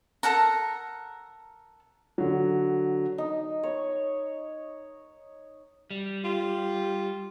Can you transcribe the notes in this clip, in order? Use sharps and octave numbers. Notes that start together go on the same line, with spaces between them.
A4 A#4 F#5 A#5
D3 F#3
D#4
C#5
G3
F4 G4